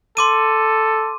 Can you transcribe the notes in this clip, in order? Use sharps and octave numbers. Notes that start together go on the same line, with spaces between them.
A4 C6 D6 D#7